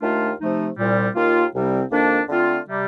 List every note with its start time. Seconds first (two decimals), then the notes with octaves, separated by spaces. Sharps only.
0.02 D#2 D#3 A3 D4 F4
0.39 C3 F3 A3 D#4
0.78 C2 A#2 G3
1.14 D#2 D#3 A#3 F4
1.53 C2 C3 G3 C4
1.90 F2 D#3 A#3 D4
2.28 D3 A3 C4 F4
2.67 C3 G3